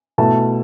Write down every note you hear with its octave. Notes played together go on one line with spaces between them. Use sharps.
B2 A3 E4 A5